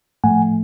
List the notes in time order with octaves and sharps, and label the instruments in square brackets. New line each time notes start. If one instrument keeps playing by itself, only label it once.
[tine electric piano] A2 F3 A3 F#5 G#5